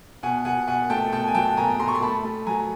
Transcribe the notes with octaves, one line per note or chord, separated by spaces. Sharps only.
B2 F#5 G#5
B2 F#5 G#5
B2 F#5 G#5
A3 G5 A5
B2 G5 A5
G#5
F#3 G5 A5
B2 G#5 A#5
A3 A#5 C6
C#6
C6
A3 A5 B5
A3
F#3 G#5 A#5